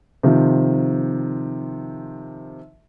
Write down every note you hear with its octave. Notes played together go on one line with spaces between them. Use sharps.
C3 D#3 F3